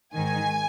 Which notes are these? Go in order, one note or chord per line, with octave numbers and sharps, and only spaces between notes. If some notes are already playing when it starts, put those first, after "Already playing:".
G#2 D#3 G#5